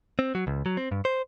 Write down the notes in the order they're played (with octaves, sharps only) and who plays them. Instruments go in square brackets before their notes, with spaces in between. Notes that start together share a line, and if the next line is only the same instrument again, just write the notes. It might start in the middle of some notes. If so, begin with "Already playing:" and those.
[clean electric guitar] C4
F#3
C#2
F#3
C4
G2
C5